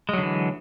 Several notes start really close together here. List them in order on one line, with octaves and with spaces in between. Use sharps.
G#3 F#3 D3 E3